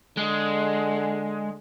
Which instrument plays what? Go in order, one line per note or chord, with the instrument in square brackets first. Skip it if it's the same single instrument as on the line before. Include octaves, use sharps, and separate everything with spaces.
[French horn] D3 [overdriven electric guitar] G#3